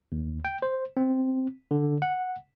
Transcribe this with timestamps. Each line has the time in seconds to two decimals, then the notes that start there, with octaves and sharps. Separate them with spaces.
0.12 D#2
0.45 G5
0.62 C5
0.97 C4
1.71 D3
2.02 F#5